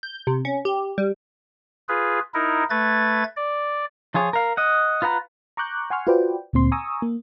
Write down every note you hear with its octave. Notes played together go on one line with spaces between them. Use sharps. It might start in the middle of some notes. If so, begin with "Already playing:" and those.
G6
C3
C#4
G4
G3
F4 G#4 B4
D#4 E4 A#4
A3 B4 G#6 A6
D5
F3 F4 G#4 C#5
A#4 F5
D#5 F#5
F4 B4 F#5 A#5
A#5 C#6 D6 F#6 G6
F#5 G#5 C6 C#6 F6
F4 F#4 B4 C5 D5 G5
D2 A#2 C4 C6
G#5 A#5 C#6 D#6 E6
A#3